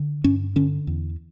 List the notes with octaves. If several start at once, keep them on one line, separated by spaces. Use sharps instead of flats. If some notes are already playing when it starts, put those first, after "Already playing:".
Already playing: D3
G2 C#4
D3 C#4
E2